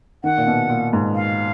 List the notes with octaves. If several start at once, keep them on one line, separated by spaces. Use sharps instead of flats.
D#3 F#5
A#2
B2
A#2
G#2
F5